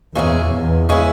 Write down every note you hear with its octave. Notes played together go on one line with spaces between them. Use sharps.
E2 A#2 G#3 C#4 E4 G#4
E2
C#3 G#3 C#4 E4